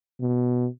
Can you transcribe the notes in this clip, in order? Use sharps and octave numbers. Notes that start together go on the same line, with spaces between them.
B2